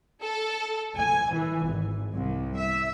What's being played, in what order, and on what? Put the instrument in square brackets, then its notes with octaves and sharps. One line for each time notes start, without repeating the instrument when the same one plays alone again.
[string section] A4
G#5
E3
G#1
C2
E5